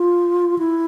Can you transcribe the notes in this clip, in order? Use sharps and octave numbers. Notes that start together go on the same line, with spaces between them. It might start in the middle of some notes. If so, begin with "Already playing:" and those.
Already playing: F4
E4